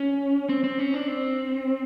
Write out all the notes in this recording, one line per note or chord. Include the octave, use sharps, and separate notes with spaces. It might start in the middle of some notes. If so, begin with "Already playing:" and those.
Already playing: C#4
C4
C4
C#4
D4
C4